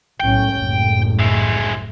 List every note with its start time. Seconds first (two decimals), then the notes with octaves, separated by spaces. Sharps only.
0.20 B1 A2 C#4 G5
0.53 F#1 C2 A2
1.19 G#3 E4